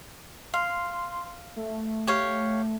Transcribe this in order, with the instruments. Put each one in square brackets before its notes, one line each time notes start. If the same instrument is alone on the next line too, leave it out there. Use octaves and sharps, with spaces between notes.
[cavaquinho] F5 [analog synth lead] C6
[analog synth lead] A3
[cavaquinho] G4 C#5 F5